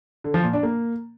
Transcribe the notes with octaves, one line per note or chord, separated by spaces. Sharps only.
D3
F3
A#2
D4
A#3